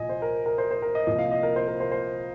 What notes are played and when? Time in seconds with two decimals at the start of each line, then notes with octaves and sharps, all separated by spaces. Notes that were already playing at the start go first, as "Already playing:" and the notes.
Already playing: C2 A#2 F3 D#5 G#5
0.09 C5
0.22 A#4
0.46 A#4
0.58 C5
0.71 C5
0.82 A#4
0.95 D#5
1.07 C2 A#2 F3 D#5
1.18 F5
1.31 D#5
1.43 A#4
1.56 C5
1.68 A#4
1.80 C5
1.92 C5